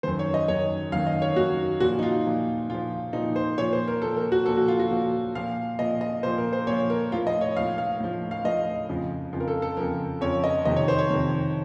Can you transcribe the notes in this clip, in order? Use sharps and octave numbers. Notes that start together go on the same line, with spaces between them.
F#2 D#3 C5
C#5
D#5
F#2 D#3 C#5
F#2 D#3 F5
D#5
C#5
F#2 D#3 F#4
A#2 F3 F#4
D#4
F4
A#2 F3
A#2 F3 F4
A#2 F3 D#4
C5
A#2 F3 C#5
C5
A#4
A#2 F3 A4
A#4
F#4
A#2 F3 A4
F#4
F4
F#4
A#2 F3
A#2 F3 F5
A#2 F3 D#5
D#5
A#2 F3 C5
A#4
C5
A#2 F3 C#5
A#4
A2 F3 F4
D#5
C#5
A2 F3 F5
F5
A2 F3
F5
A2 F3 D#5
F2 C#3 F3
F2 C#3 F3 F4
A#4
A4
A4
F2 C#3 F3 A#4
F2 C#3 F3 C#5
D#5
F2 C3 D#3 D#5
C#5
C5
C#5
F2 C3 D#3